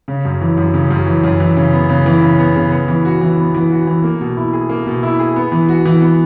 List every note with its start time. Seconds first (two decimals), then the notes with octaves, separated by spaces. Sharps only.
0.08 C#3
0.25 F#2
0.41 E3
0.57 F#2
0.74 C#3
0.90 F#2
1.07 E3
1.23 F#2
1.40 E3
1.57 C#3
1.73 B3
1.89 C#3
2.06 E3
2.22 C#3
2.39 B3
2.56 C#3
2.72 B3
2.88 E3
3.05 F#4
3.21 E3
3.38 B3
3.54 E3
3.71 F#4
3.87 E3
4.04 A#3
4.21 B2
4.37 E4
4.53 G#4
4.70 A#3
4.87 B2
5.03 E4
5.20 G#4
5.36 B3
5.52 E3
5.69 F#4
5.85 E3
6.01 B3